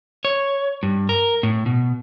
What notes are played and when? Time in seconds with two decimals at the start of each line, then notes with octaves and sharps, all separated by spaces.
0.25 C#5
0.83 G2
1.09 A#4
1.43 A2
1.66 B2